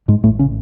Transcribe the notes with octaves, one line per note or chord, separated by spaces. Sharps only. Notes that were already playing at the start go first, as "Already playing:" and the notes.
G#2 G#3
A1 A2 A3
C#3 C#4